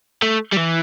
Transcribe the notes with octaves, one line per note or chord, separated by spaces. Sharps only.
A3
G3
E3